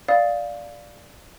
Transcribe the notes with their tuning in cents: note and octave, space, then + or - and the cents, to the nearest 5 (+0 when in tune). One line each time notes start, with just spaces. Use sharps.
D5 +0 F5 +0 D#6 +20